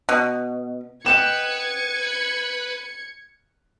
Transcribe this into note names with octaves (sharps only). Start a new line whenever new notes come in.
B2
B4 D#5 F#5 G5 G#6 C#7 E7